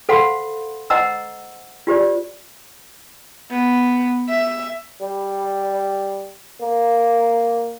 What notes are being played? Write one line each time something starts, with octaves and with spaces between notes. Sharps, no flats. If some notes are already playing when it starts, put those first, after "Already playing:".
A4 C5 F5 F#5 B5 C6
C5 D#5 F#5 A#5 E6
F4 G4 C5 D5
B3
E5
G3
A#3